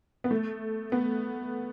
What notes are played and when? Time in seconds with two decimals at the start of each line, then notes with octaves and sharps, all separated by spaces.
0.24 B3
0.31 A3
0.92 B3